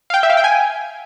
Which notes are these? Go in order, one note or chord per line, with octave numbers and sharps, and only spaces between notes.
F5
G5
E5
F5
G5
G#5